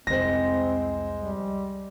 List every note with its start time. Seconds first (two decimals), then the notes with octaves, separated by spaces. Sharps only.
0.07 C2 F2 G#3 C4 C5 A#6
1.18 G3